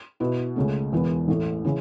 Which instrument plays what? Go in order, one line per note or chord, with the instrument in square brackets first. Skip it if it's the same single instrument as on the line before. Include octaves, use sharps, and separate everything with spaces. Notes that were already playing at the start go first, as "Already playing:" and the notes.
[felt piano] B2 B3 E4
C#2 C#3 A3
E1 E2 E3 B3
A1 A2 A3
C#3 E3